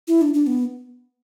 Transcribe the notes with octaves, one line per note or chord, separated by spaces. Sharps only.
E4
D4
D4
B3